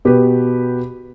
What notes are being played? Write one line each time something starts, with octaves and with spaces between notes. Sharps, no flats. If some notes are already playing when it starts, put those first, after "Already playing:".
B2 B3 G4 B4